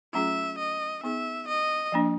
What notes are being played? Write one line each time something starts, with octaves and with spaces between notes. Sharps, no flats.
F#3 A3 C#4 F4 G#4 E5
D#5
B3 D#4 G#4 E5
D#5
F3 A#3 D4